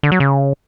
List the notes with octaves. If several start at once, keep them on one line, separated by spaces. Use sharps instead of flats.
D3
F#3
C#3